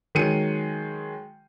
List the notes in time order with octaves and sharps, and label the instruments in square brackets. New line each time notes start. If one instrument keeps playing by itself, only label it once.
[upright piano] D#3 F#3 G#3 C#7 D#7